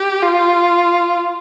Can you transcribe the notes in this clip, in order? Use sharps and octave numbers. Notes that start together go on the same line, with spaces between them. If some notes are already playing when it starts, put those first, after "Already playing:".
Already playing: G4
F4